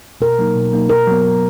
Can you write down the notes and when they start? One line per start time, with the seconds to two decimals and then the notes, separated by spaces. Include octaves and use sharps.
0.21 B2 A#4
0.39 F#3 A#3 D#4
0.55 B2
0.72 F#3 A#3 D#4
0.89 B2 A#4
1.07 F#3 B3
1.24 B2